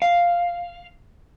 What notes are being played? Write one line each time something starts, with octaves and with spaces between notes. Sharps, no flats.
F5